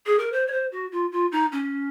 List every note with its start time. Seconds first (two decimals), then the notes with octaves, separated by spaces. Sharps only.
0.06 G#4
0.19 A#4
0.32 C5
0.47 C#5
0.52 C5
0.72 F#4
0.92 F4
1.12 F4
1.32 D#4
1.52 C#4